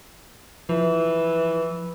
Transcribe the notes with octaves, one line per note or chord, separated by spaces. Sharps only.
E3 F3